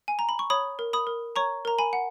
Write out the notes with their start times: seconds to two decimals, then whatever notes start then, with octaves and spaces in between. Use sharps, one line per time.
0.08 G#5
0.19 A#5
0.29 B5
0.39 C#6
0.50 C#5 B5 D#6
0.79 A#4
0.93 B5 D#6
1.07 A#4
1.36 C#5 A#5 C#6
1.65 A#4 A#5
1.78 G#5 B5
1.93 F#5